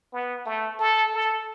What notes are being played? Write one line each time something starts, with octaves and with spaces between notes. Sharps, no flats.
B3
A3
A4
A4